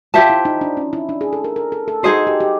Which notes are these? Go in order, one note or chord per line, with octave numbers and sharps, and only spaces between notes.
F4 G4 C5 E5 A5
E4
D#4
D4
C#4
E4
D4
G#4
A4
A#4
A#4
A4
A4
D#4 F#4 G#4 C5 D#5
G4
G4